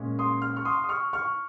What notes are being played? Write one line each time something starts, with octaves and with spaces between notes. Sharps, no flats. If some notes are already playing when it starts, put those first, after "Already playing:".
Already playing: A#2 G#3 C#4
C6 D#6
F6
C#6 F6
C6 D#6
D#6
C#6 F6
C#6 F6